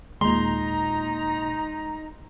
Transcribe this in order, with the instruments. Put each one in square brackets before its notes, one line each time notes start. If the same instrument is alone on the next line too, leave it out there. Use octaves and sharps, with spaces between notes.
[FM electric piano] D#2 A#2 [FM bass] G#3 [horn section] D#4 A#5 [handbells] C6